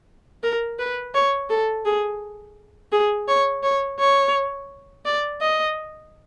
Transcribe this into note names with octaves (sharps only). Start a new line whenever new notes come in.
A#4
B4
C#5
A4
G#4
G#4
C#5
C#5
C#5
D5
D#5